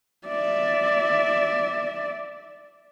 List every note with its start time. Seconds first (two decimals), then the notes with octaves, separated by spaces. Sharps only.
0.27 D5 E5